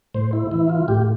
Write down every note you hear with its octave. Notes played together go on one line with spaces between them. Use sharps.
A2 C5
E4
E3 E4
F4
A2 G4